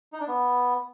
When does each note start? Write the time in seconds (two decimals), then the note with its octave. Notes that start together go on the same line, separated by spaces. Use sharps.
0.13 D#4
0.20 D4
0.28 B3